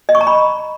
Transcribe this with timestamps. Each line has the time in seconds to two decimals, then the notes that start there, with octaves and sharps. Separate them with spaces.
0.09 D#5
0.15 C#6
0.21 A#5
0.27 B5